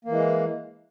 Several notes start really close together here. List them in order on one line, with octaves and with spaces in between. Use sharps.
A#3 E3 G#3